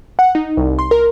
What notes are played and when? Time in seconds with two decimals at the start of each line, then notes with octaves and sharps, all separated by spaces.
0.19 F#5
0.35 D#4
0.57 C2
0.79 C6
0.91 A#4